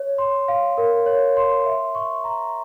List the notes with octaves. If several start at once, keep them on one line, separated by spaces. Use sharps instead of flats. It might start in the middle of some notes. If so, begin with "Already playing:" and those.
Already playing: C#5
C6
F5
A#4
C#5
C6
E5
C#6
A#5